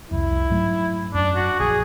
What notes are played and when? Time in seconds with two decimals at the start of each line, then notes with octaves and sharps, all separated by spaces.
0.11 C2 F2 E4
0.50 G#2 F#3 A3
1.15 F#2 D4
1.36 F#4
1.60 A#1 F3 G#4